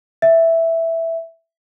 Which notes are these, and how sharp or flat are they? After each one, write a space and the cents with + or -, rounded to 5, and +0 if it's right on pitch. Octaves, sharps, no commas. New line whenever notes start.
E5 +0